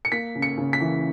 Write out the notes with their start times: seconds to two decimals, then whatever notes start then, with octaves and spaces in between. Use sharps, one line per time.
0.05 C#7
0.12 A#3 B6
0.35 C#3
0.42 C#7
0.58 C#3
0.73 B6
0.80 E3